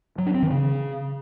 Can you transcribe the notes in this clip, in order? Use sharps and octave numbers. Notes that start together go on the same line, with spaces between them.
F#3
D4
C4
D#3
C#3